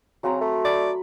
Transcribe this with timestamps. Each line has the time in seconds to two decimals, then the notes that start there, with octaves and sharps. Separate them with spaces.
0.23 C#3 F#3 C4 A#5
0.41 A3
0.65 D5 B5